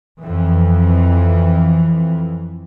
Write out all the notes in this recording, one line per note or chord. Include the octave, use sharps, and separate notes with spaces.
F2 E3